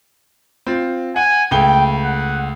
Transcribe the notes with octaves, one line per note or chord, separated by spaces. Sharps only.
C4 F4
F#5 G#5
C#2 A3 G5 G7
F#5